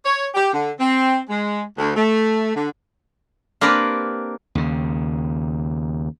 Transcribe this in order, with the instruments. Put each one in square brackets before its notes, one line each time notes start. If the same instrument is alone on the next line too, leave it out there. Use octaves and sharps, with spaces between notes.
[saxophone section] C#5
G4
D3
C4
G#3
D2
A3
D3
[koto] A#3 C4 D4 G4 A#4 B4
[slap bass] D#2 C#3